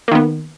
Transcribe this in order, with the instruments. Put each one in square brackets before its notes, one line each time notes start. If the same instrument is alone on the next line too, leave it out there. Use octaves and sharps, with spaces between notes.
[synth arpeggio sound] A#3
D#3
B3